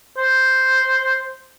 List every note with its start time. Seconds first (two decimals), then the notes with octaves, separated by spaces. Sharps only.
0.18 C5